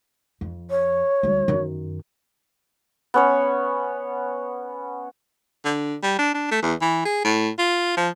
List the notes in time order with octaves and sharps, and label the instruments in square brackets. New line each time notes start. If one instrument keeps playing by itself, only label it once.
[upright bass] F2
[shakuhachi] C#5
[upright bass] D2 G3
F#2 D#3
[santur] B3 C#4 C#5
[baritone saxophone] D3
G3
D4
D4
A3
E2
E3
G#4
A2
F4
F3